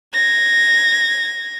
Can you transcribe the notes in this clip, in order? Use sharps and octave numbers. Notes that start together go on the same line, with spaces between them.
G#6 A#6